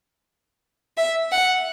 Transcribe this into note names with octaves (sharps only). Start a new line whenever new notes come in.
E5
F#5